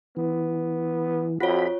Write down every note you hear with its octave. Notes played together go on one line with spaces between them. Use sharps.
E3 B3
F2 F4 F#4 C#5 B5